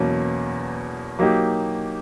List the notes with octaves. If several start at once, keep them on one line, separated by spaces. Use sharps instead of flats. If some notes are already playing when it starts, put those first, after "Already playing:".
Already playing: E2 B2 F#3 A#3 C#4
F#3 A#3 D#4 G4